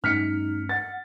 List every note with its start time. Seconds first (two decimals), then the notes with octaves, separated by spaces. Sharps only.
0.04 G2 A3 C#4 D#4 F6 B6 C#7
0.69 F#5 A6